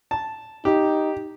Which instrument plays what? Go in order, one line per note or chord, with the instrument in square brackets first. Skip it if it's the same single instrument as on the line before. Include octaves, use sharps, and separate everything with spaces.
[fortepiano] A5
[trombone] D#4 [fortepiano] G4